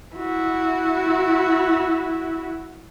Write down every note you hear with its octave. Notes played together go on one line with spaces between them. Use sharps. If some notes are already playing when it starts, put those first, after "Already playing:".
E4 F#4